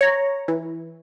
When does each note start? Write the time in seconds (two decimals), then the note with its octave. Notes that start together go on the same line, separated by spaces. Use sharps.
0.01 C#5 A#5
0.48 E3